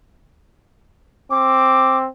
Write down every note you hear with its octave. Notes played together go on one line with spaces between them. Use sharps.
C4 D6